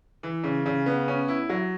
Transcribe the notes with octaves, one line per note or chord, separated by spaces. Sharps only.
E3
C#3
C#3
B3
C#4
E4
F#3